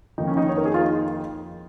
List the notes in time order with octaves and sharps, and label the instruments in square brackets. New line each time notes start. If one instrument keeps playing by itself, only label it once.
[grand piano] F2 D#3 A#3 D#4
C#4
D#4
C#5
A#4
G#4
F4
D#4